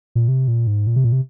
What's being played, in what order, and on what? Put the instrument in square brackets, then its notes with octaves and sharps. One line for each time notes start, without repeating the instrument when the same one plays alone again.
[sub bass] A#2
C3
A#2
G#2
A#2
C3
A#2
C3